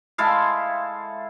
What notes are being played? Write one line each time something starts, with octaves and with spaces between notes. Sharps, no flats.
G#3 E4 A4 F5